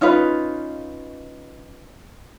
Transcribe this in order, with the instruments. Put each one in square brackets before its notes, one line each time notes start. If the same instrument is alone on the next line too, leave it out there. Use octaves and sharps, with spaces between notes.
[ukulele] C#4 D#4 F4 B4